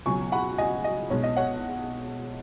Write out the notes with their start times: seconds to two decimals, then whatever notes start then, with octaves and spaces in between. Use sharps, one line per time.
0.06 C#2 B2 F#3 G#5 C#6
0.32 F#5 B5
0.58 D#5 G#5
0.84 D#5
1.10 B1 B2 G#3 C#5
1.24 D#5
1.37 C#5 F#5